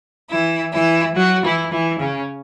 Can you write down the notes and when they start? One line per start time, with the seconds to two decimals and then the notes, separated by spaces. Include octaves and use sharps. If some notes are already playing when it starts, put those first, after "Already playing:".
0.32 E3 E4
0.74 E3 E4
1.15 F#3 F#4
1.44 E3 E4
1.72 E3 E4
2.00 C#3 C#4